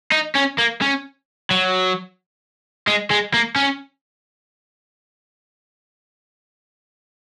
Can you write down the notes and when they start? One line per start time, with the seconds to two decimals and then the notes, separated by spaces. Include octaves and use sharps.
0.12 D#4
0.36 C#4
0.58 A#3
0.82 C#4
1.51 F#3
2.87 G#3
3.10 G#3
3.34 A#3
3.56 C#4